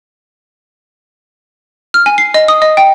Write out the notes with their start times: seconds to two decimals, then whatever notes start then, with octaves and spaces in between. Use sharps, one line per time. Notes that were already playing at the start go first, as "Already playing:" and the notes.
1.94 F6
2.06 G#5
2.18 C7
2.34 D#5
2.48 D#6
2.62 D#5
2.77 G5